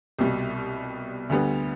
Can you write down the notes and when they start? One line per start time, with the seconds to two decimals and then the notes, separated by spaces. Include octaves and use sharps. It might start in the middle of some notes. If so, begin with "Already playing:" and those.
0.19 C2 B2 G3
1.29 D2 D3 G3 B3